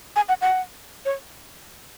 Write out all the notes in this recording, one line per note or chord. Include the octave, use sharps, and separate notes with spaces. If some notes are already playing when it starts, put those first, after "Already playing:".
G#5
F#5
F#5
C#5